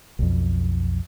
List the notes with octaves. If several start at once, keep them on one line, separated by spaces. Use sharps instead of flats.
B1 F2